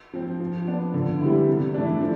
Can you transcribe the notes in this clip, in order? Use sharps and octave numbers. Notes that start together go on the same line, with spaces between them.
F3 C4
F3
B3 D4
D3
G3 B3 E4
C3
E3 A3 D4
F3